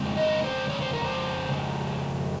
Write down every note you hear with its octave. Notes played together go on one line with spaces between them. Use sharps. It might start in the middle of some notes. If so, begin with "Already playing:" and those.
Already playing: F2 C#3 G#3 C4
D#5
C5
C#5
C5
A#4
C5
F2 C#3 G#3